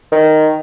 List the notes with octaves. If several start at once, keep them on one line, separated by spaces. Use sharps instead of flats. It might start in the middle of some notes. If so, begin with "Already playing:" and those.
D#3